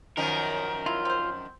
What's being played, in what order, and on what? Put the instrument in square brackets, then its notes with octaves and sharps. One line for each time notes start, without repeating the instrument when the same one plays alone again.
[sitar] F#2 D#3 F3 [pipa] B3 [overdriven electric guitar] A#4
[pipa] E4 [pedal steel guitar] F4
[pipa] C4 C5